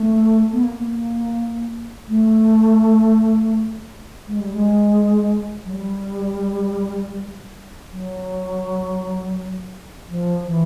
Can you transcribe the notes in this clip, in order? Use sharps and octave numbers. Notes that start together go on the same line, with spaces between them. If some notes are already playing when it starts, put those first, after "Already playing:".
Already playing: A3
B3
A#3
A3
G#3
G3
G#3
F#3
G3
F#3
F3
E3